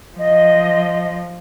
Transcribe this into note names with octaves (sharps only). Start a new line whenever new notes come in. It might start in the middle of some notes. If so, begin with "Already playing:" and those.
F3 D#5